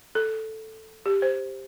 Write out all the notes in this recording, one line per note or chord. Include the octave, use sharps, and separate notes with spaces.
A4
G4
C5